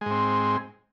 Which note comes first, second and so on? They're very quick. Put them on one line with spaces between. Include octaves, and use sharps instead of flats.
G#3 G#2 C4